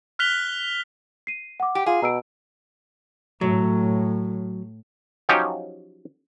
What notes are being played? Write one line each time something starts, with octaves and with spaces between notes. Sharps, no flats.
F6 F#6 B6 F7 G7
C7 D#7
F#5 D6
G4
F4 G#4
B2 A#5 E6 D7
A2 F#3
F3 F#3 C#4 D#4 G4